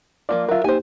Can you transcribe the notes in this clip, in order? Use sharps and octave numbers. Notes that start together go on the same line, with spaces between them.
F3 A#3 F4 D5
F#3 F4 A#4 E5
A#3 D#4 G4 C5 G#5